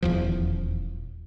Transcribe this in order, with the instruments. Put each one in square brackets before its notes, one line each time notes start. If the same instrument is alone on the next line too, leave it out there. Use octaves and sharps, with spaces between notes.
[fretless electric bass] D#1 E2 F3